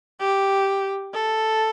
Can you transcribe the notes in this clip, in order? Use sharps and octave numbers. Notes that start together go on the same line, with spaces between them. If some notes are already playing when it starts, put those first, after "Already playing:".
G4
A4